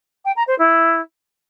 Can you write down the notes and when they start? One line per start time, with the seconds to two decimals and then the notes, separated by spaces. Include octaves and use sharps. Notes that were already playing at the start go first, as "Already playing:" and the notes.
0.25 G5
0.36 A#5
0.47 C5
0.58 E4